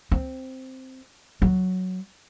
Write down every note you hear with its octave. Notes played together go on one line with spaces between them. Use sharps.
C4
F#3